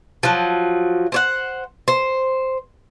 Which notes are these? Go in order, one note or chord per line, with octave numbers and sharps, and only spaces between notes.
F3 F#3
C5 C#5 F#5
C5